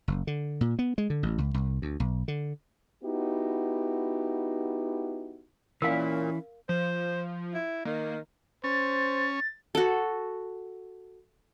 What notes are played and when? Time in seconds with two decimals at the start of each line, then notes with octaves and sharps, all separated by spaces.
0.08 F#1
0.27 D3
0.61 A#2
0.79 B3
0.98 G#3
1.10 D3
1.23 A1
1.38 C#2
1.54 C2
1.82 D2
2.00 B1
2.28 D3
3.04 B3 D#4 E4 F#4 G4
5.82 A#2 E3 C#4 E4 A#4 F5
6.69 F3 C5
7.54 E4
7.85 D#3 A#3
8.64 C#4 C5 A6
9.75 F#4 A4